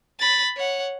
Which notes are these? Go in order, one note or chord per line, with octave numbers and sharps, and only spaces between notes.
B5 A6
C#5 F#5